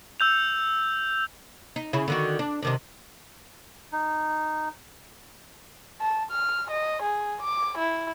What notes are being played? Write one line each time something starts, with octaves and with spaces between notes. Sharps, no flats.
E6 G6 F7
D#4
C#3 E4
D3 D#3 F#4
D4
C3 D#3 D4
D#4
A5
F6
D#5
G#4
D6
E4